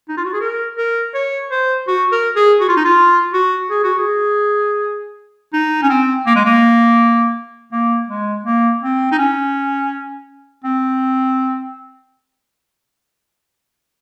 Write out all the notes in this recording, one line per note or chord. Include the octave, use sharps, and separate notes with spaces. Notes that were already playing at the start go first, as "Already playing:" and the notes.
D#4
F4
F#4
G#4
A#4
A#4
C#5
C5
F#4
A#4
G#4
F#4
F4
D#4
F4
F#4
G#4
F#4
G#4
D#4
C#4
C4
A#3
G#3
A#3
A#3
G#3
A#3
C4
D#4
C#4
C4